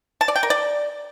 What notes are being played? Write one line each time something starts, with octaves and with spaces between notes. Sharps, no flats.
A5
D5
G5
A#4
D5